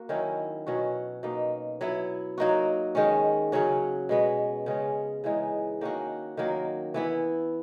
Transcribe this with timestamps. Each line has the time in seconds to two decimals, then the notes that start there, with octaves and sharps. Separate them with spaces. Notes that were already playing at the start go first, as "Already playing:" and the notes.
Already playing: A#3 F#4
0.09 D#3 F#3 C#4 E4
0.67 B2 F#3 C#4 F#4
1.23 B2 A#3 D#4
1.81 F#3 B3 E4
2.38 F#3 A#3 D#4 F#4
2.95 D#3 G#3 C#4
3.52 C#3 F#3 C#4 F#4
4.09 B2 G#3 B3
4.66 C#3 G#3 C#4
5.24 C#3 E3 G#3 D#4
5.81 D#3 A#3 C#4 F#4
6.37 D#3 F#3 A#3
6.94 E3 B3 E4